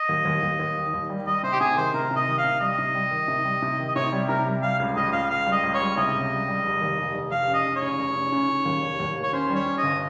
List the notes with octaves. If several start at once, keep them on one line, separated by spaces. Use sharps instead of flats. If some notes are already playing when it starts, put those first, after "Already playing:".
Already playing: D#5
D#2
D#2
D#2
D#2
D#3
D#2
G3
G3 D#5
C3 C5
G4
C3 G#4
D#3 C5
C3 A#4
C3
D#5
D#3
F5
C3
G3 D#5
C3
G3
D#3
C3
G3
C3
D#3
D#5
C3 C#5
G3
C3 A#4
G3
G3 F5
C#2
C#2 D#5
C#2 F5
C#2 F5
G3
D#5
C#2
C#5
G3
C3 D#5
C#2
G3
G3
F1
D#2
F1
F1
F1 F5
C#3
D#5
F1
C#5
C#3
F1
C#3
C#3
C#3
D#2
F1
D#2
D#2
C#5
C#4 C5
G3
C#5
C#4
G1 D#5